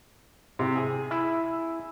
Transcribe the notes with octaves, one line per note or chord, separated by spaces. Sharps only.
C3
G#4
E4